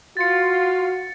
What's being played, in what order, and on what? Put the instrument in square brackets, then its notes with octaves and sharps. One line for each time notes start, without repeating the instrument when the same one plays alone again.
[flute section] F4 [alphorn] F#4 [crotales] A6 C#7